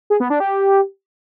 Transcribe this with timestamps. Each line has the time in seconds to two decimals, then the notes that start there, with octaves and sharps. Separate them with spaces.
0.10 G#4
0.20 B3
0.30 D4
0.40 G4